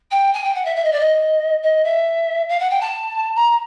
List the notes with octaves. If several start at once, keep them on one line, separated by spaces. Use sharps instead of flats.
G5
G#5
G5
F#5
E5
E5
D#5
D5
D#5
D#5
E5
F5
F#5
G5
A5
A#5